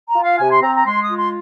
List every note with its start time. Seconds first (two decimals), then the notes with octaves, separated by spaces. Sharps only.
0.08 A#5
0.15 F4
0.24 F5
0.39 C3 G#5
0.51 C6
0.62 C4 A#5
0.75 A#5
0.86 G#3 C6
1.02 D#6
1.09 F4
1.17 C6